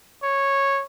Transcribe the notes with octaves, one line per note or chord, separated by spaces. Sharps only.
C#5